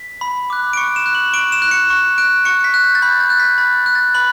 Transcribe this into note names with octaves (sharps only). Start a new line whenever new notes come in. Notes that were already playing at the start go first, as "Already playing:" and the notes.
Already playing: B6
B5
D6 F#6
D7
C#6 C#7
E7
F#6
F#7
C#6 D7
E7
F#6
C#7
C#6
F#6 D7
C#6 C#7
C#7
B6
F#6
G6
A6
B5 G6
A6
F#6
B6
B5 A6
F#6
A6
B5 F#7